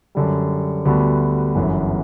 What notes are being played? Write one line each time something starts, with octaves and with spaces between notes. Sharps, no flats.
F#2 D3 G3
D2 D3 G3 B3 F#4
G1 F#2 E3